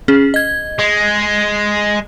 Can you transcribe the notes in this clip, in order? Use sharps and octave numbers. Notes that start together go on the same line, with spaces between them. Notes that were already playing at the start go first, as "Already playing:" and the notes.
C#4 G#4
D#5 G#6
G#3